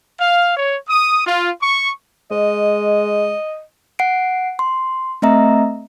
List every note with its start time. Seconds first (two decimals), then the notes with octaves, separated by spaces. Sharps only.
0.20 F5
0.57 C#5
0.88 D#6
1.26 F4
1.61 C#6
2.31 G#3 D#5
3.99 F#5 C7 D7
4.59 C6
5.22 A3 C4 D#5 E5 A#5